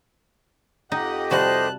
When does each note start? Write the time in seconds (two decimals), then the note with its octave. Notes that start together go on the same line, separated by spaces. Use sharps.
0.92 F2 D#4 G4 D#5 F#5
1.31 C3 G3 F#4 C5 A5 F#6